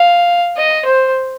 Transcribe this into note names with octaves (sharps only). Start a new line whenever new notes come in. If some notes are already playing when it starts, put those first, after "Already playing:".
Already playing: F5
D#5
C5